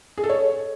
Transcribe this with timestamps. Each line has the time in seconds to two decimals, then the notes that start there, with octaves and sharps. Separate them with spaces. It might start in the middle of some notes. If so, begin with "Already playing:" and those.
0.18 G#4
0.24 A4
0.29 C#5